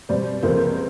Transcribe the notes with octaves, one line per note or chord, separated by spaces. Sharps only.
B2 G3 C4 C5 D5
C#2 C3 F3 A#3 A#4 C5